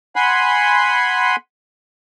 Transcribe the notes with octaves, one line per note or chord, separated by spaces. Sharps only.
F#5 G#5 B5 C6